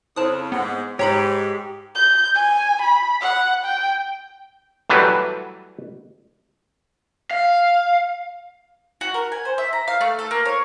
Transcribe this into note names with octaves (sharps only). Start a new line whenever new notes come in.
F2 C#3 E4 C5 A5 C6 D#6
G#2 G#3 B3 F#5
G#2 G4 C#5 A#5 B5
G6
G#5
B5
F#5
G5
E3 F#3 G3 A3 B4
F5
F#4
A#4
G#5
C5
E5
A#5
F5
A3
A4
A#3
C#5